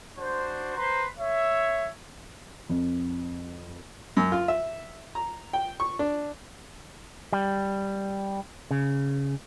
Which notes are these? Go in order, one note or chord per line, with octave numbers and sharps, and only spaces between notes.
D4 F#4 C5
B4 C5 A#5 C6
C#5 E5
F2
F#2
F4
E5
A#5
G5
C#6
D4
G3
C#3